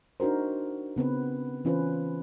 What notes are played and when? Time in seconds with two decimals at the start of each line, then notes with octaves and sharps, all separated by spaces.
0.20 D4 D#4 F#4 A#4 C5
0.96 C#3 B3 C4 B4
1.65 E3 C#4 F4 B4 C5